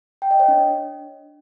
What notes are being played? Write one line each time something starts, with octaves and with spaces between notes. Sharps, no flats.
G5
D#5
C#5
D4